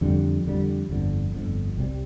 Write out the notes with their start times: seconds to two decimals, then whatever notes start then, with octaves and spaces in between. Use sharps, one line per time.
0.01 F2 D3 G3
0.45 F2 D3 G3
0.89 G1 F2 D3
1.34 G1 F2 D3
1.77 C2 C3 G3